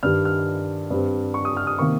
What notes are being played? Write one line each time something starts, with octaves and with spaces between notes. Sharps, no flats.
G2 D#3 G3 F6
F6
G2 G3 C4
C#6
D#6
F6
D#6
C3 D#3 A#3 C#6